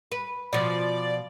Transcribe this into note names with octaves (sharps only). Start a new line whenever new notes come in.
B4
B2 F3 D5